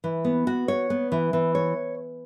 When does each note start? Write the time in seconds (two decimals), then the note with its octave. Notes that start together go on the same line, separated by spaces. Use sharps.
0.04 E3
0.25 B3
0.47 F#4
0.68 C#5
0.90 B3
1.12 E3
1.33 E3
1.55 C#5